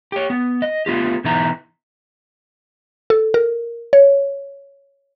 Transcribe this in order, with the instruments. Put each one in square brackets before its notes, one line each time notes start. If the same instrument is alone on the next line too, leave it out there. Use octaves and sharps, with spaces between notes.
[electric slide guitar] G4 C#5
B3
D#5
A3 B3 F4 G4
B2 E3 B3 D#4 E5 A#5
[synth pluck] A4
A#4
C#5